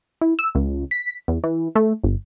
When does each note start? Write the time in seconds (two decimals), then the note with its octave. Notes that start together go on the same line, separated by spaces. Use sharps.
0.21 E4
0.39 E6
0.55 C#2
0.91 B6
1.28 E2
1.44 E3
1.75 A3
2.03 G1